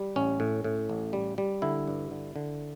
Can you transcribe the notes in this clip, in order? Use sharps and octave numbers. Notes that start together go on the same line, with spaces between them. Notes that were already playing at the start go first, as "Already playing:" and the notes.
Already playing: G3
A1 C#4
A2
A2
A1
G3
G3
D3 E4
G2
D3
D3